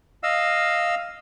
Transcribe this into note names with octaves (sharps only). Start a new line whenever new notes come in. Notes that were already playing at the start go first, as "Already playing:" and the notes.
D#5 F5 E6